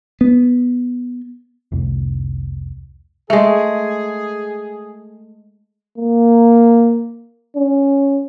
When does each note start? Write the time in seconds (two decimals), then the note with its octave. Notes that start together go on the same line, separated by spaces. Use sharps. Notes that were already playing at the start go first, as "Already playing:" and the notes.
0.21 B3
1.72 F1 C2
3.30 G#3 A3 G#4
5.98 A#3
7.56 C#4